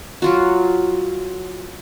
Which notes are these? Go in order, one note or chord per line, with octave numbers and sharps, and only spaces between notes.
F#3 F4 F#4